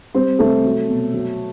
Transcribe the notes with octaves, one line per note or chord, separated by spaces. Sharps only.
G3 C4 C5
C3 A3 A4
F#3
B2
F#3